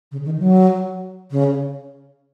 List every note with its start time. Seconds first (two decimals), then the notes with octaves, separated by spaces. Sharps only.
0.11 C#3
0.25 D#3
0.39 F#3
1.31 C#3